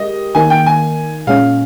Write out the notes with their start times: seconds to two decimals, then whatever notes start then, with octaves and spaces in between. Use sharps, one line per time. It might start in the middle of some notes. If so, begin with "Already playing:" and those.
Already playing: G#3 G4 A#4 D#5
0.35 D#3 A#3 D#4 G#5
0.50 G5
0.67 G#5
1.27 A#2 G#3 C#4 F5